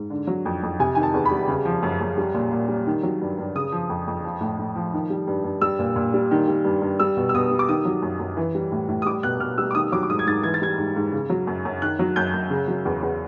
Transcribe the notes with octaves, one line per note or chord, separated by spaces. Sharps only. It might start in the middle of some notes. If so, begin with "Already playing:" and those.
Already playing: G#2
D3
F#3
F2
F2
C3 G#5
D#3 G#5
A5
E2
B5
G3
C#3
F3
F#2
F#2
G3
A#2
A#2
G3
D#3
F#3
G2
G2
C#3 D#6
F3
F2
F2
F3
A2
A2
F3
D#3
G3
G2
G2
G3 E6
A#2
A#2
G3
D#3
G3
G2
G2
G3 E6
B2
E6
B2 D#6
G3
D6
D#3 D#6
F#3
F#2
F#2
E3
G3
A2
A2
D#6
G3 D6
B2 F#6
B2 F6
G3 E6
D6
D#3 D#6
F#3 D6
D6
G#2 D#6
G#6
G#2 A6
E3 G#6
A6
G3 G#6
G#2
G#2
C#3
F#3
F#2
F#2
D#3 F#6
F#3
F#2 G6
F#2
C#3
F#3
E2
E2